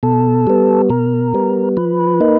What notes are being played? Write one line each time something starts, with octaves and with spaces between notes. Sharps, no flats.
B2 A4
G3 B3
B2 A#4
G3 B3
F3 B4
A#3 D#4